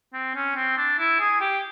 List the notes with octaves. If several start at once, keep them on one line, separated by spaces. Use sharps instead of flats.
C4
C#4
C4
D4
E4
G#4
G4